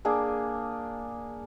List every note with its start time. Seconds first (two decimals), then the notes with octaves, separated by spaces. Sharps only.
0.05 A#3 D4 G#4